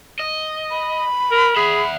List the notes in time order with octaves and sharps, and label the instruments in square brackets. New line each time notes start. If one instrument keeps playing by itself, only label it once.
[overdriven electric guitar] D#5
[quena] B5
[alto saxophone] A#4
[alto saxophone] G#4 [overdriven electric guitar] E5 F#5